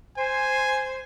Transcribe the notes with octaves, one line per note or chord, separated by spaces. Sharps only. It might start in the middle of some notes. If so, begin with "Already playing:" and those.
C5 G#5